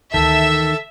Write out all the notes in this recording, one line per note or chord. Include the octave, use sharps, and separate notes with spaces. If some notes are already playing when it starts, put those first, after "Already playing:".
D2 D#3 E3 A4 E5 A5